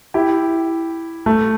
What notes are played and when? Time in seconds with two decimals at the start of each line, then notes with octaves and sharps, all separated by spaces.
0.14 E4 G4
1.26 A3